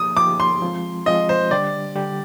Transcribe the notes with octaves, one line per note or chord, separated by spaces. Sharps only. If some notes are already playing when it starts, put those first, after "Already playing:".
Already playing: F3 A#3 D#4 G4 D#6
F3 A#3 D#4 G4 D6
C6
F3 G#3 C4 F4
F3 G#3 C4 F4 D#5
C5
D3 G3 D4 G4 D5
D3 G3 D4 G4